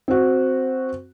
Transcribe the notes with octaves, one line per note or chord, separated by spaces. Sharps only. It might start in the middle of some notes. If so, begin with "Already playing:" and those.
C4 F#4